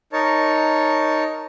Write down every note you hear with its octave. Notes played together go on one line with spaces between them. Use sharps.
D#4 A#4 C#5 A5